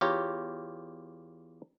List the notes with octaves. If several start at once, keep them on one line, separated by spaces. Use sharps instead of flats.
E2 F4 G4 C#5 A#5